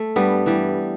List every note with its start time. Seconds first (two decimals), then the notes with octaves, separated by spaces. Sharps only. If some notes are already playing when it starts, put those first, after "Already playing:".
Already playing: A3
0.16 G2 G3 B3
0.46 E3 G3